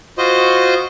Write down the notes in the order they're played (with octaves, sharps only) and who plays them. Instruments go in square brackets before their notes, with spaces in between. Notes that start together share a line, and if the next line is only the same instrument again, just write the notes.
[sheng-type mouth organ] F4 F#4 C5 D#5